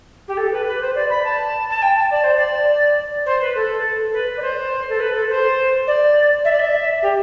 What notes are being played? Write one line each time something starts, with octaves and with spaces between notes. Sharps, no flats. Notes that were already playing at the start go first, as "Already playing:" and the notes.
G4
A4
B4
B4
C5
D5
B5
A5
A5
G5
A5
D5
C5
D5
C5
B4
A4
B4
D5
C5
A4
B4
A4
C5
D5
E5
D5
E5
G4